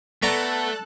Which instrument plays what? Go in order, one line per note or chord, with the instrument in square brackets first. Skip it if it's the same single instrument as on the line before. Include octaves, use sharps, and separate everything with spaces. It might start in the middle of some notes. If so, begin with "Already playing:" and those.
[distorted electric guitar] A3 [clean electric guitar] B3 [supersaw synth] A4 A5 F#6 [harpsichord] D5 A#5 C#6